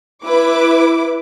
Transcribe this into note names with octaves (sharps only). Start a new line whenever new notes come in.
E4 B4 D6